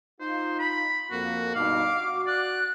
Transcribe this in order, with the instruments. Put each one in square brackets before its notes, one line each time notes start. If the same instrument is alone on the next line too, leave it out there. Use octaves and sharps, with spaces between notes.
[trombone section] D#4 F4 [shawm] C5
[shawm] B5
[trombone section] F2 A#3 [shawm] F#4
[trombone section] G2 B2 D#4 [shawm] F5 [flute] D6
[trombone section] F#4
[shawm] D5 [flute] F#6